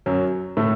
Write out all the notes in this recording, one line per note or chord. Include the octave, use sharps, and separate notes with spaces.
F#2 F#3
A2 A3